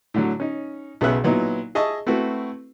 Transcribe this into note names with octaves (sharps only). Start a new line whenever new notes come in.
A2 D3 F#3
C#4 D#4
B1 C#3 B3 G#4 E5 F#6
A#2 F#3 B3 D#4 E4
G#4 D#5 E5 A5 C#6
A3 C4 E4 F#4 B4